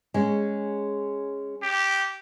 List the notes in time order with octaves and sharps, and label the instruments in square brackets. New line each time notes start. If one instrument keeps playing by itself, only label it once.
[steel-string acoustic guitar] G#3 C#4
[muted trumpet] G4